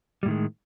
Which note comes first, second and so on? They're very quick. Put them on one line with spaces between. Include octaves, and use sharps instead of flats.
G3 A2 D#3 G#3